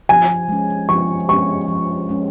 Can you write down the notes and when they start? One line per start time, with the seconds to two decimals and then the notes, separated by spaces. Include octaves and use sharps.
0.09 F3 G#5
0.49 G#3 C#4
0.89 F3 C#6
1.29 G#3 C#4 C#6
1.68 F3
2.09 G#3 C#4